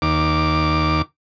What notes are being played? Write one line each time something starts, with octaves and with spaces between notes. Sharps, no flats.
D#2 D6